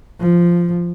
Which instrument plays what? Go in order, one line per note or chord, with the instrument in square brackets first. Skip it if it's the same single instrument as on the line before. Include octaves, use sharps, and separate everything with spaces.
[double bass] F3